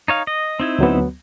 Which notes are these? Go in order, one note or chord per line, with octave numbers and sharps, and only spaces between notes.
D#4 C#5 F5
D#5
C4 D#4 E4
D2 F#3 B3